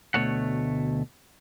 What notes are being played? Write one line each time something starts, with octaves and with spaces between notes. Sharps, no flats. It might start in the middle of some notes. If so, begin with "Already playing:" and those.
D2 B2 A3 C#5 F#5